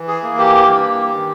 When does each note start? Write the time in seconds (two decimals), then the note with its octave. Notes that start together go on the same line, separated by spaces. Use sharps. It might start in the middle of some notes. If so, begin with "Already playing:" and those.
Already playing: E3
0.08 G#4
0.23 A#3
0.38 G4
0.68 G2
1.12 D#3